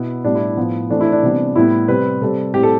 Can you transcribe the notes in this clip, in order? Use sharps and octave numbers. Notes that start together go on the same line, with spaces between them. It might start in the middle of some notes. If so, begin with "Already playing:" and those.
Already playing: B2 B3 E4
A2 G3 B3 D4
E4
A2 F3 B3
E3 A3 C4 D4
E4
D4
C3 E3 G3 B3
A2 G3 B3 E4
C3 G3 C4 B4
C3 G3 C4 A4
A2 G3 C4 G4
A4